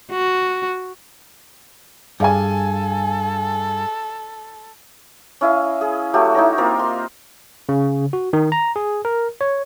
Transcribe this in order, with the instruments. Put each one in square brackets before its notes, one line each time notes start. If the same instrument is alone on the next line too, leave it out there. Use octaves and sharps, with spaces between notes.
[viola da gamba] F#4
[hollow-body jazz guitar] G2 [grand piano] G#4 F5 G#5 [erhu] A4
[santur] C#4 E4 D#5 F5
G#4
F#3 A3 F#4 G4
D#4 E4 C#5 A#5
A#3 C4 F4 A#4
C6
[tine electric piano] C#3
F#4
D#3
A#5
G#4
A#4
C#5